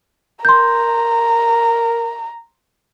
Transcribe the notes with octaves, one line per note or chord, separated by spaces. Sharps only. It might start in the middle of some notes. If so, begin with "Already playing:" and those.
A#4 A#5 C6 G6